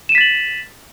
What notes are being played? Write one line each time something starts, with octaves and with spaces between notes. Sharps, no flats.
A6 B6 D#7 E7 F#7